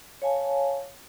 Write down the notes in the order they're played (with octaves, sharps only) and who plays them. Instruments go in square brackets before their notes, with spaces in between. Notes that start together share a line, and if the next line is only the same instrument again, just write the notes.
[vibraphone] C#5 F5 G#5 A5